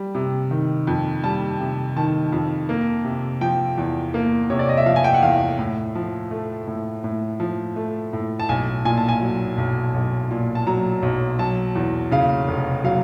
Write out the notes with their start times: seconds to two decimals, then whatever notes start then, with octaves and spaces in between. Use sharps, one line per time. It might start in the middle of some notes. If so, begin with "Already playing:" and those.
Already playing: G3
0.15 C3
0.51 D#3
0.87 F2
1.24 G3 A5
1.60 C3
1.96 D#3 A5
2.33 F2
2.69 A#3
3.05 C3
3.41 F3 G5
3.78 E2
4.14 A#3
4.50 C3 C#5
4.59 D5
4.69 D#5
4.77 E5
4.86 F3 F5
4.96 G#5
5.04 G5
5.14 F#5
5.22 E2 F5
5.59 A2
5.95 F3
6.31 A3
6.67 A2
7.04 A2
7.40 F3
7.76 A3
8.13 A2
8.40 A5
8.49 B1 G#5
8.85 A#2 G#5
8.97 A5
9.09 G#5
9.22 F#3
9.58 B1
9.94 B1
10.31 A#2
10.55 A5
10.67 F#3 A#5
11.03 B1
11.39 F#3 A5
11.75 E2
12.11 C#3 F5
12.48 F1
12.84 F#3 F5